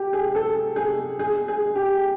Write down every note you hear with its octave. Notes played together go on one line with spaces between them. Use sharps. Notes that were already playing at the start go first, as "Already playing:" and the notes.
Already playing: G4
G#4
A4
G#4
G#4
G#4
G4